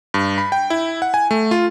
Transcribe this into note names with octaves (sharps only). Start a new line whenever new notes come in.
G2
B5
G5
E4
F#5
G#5
A3
F4